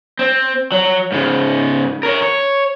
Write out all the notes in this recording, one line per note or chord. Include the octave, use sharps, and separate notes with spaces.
C4
F#3
G#2 C#3
A#4 C#5
C#5